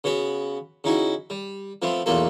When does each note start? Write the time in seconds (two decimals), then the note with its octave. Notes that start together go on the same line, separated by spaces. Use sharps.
0.04 C#3 B3 F#4 B4
0.84 C#3 D#4 E4 F#4
1.30 G3
1.82 F3 A3 B3 C4
2.06 B1 E2 A3 A#3 F4 A4